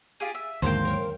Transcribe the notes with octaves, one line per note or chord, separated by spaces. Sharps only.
F4 G4 G#4
E5
D#2 G#2 D3 F#3 A#3 C5 F5 G5
A#4 C#5